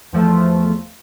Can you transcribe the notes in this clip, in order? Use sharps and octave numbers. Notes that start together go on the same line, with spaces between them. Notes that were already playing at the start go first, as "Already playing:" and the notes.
E2 F3 A3